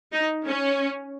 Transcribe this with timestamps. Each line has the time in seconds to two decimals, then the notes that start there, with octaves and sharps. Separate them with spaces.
0.13 D#4
0.46 C#4